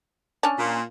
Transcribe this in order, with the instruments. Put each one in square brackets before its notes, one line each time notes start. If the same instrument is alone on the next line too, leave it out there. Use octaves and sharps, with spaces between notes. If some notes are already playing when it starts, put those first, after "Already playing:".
[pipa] C#4 D4
[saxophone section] A#2